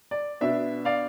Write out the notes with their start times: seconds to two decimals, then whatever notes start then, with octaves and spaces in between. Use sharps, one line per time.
0.11 D5
0.41 B2 B3 D4 E5
0.85 D5 F5